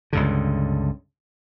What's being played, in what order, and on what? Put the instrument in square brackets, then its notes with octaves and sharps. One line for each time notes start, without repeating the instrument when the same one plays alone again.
[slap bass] C#2 G2 D3